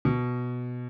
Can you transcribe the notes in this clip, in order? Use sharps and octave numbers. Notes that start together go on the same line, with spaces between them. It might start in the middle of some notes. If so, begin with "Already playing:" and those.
B2